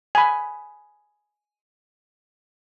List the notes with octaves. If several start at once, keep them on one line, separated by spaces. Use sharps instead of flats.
G#5 B5